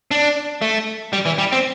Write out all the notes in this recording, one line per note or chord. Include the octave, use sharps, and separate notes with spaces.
D4
A3
G3
E3
G3
C4